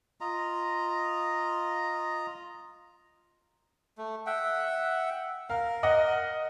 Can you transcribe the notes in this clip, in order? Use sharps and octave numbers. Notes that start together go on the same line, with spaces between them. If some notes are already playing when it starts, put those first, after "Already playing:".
F4 D#5 A#5
A3
E5 F#5 G5
A#4 F5
D#5 F#5